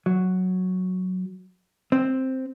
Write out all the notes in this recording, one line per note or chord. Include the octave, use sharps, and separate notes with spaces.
F#3
C4